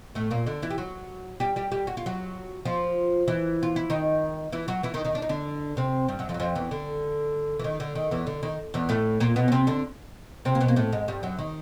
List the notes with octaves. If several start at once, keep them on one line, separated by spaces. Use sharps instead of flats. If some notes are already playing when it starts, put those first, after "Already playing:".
A2 A3
A#2 A#3
D3 D4
E3 E4
G4
F#3 F#4
G3 G4
G3 G4
G3 G4
F#4
F4
F#3 F#4
F3 F4
E3 E4
F4
E4
D#3 D#4
E3 E4
F#3 F#4
E3 E4
D#3 D#4
D#3 D#4
D4
D#4
D3 D4
C3 C4
G2 G3
F#2 F#3
F2 F3
F#3
F2 F3
E2 E3
D3
E3
D#3
D3
D#3
E2 E3
D3
D#3
E2 E3
A2 A3
A#2 A#3
B2 B3
C#4
C3 C4
D3 D4
C3 C4
A#3
B2 B3
A#3
A2 A3
G#2 G#3
G2 G3
F#2 F#3
D#3